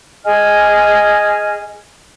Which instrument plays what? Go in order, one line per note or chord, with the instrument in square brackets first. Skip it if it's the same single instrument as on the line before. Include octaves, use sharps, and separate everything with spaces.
[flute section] G#4 D#5 G#5 F6